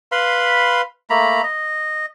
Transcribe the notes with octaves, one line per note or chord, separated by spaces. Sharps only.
B4 F5 B5 C6
A3 A#3 A#5 B5
D#5